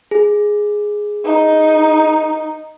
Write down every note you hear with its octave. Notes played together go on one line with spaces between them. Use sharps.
G#4
D#4